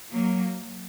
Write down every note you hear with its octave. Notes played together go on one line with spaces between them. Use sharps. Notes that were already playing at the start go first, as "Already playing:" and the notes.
F#3 A#3